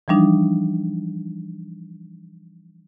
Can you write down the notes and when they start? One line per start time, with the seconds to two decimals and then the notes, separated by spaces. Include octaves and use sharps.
0.08 E3 F3 G3 D4 D#4